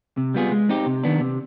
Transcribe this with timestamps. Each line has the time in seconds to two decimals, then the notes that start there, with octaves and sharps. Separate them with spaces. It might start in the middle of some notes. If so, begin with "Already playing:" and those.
0.17 C3
0.34 G3 B3 F4 G#4
0.52 G#3
0.69 C4 D#4 G4
0.86 C3
1.04 D#3 B3 D4
1.21 C3